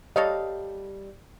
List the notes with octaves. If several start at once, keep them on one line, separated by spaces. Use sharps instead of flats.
G3 A4 C#5 D#5 F5